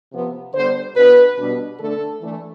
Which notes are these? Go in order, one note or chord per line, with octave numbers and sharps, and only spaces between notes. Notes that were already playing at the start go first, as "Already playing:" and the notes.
C3 F3 B3
D3 G3 B3 C5
B2 B3 D4 B4
B2 G3 D4
D3 A3 D4 A4
E3 A3 D4